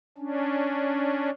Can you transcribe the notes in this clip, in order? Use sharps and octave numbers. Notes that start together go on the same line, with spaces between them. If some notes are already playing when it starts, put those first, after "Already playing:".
C#4 D4